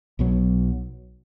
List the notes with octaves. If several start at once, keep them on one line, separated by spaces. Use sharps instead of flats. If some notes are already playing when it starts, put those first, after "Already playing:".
B1 B2 F#3